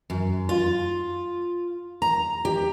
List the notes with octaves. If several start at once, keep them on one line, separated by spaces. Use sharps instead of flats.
F#2
F4
A#5
G4